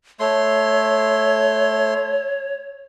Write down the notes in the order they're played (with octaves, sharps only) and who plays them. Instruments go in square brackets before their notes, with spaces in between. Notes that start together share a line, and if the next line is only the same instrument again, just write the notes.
[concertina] A3 C6 [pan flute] C#5